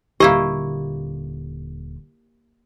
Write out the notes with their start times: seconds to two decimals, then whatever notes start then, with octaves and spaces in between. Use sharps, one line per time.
0.20 D#1 D3 A#3 E4 G4 D#5